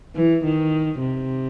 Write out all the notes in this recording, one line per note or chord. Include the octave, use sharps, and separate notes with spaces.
E3
D#3
C3